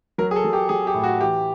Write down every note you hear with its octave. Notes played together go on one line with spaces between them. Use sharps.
F#3 A#4
G#4
A4
F#3
G4
F#3 G#4
G4
A2
F#4
E3 G4